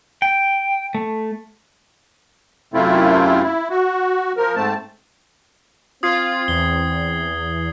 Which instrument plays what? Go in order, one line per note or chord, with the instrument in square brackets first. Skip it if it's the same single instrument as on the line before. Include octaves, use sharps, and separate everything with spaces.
[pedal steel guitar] G5
A3
[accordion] F#2 C3 A3 C4 E4 F4
E4
F#4
F3 A#4
G#2 A3 C4 A5
[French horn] C4 [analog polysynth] F4 [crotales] D#6 G#6 C7
[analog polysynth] E2 [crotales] G7